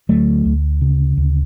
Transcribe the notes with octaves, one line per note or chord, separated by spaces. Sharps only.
D2 F#3 A3
D2
C#3
D2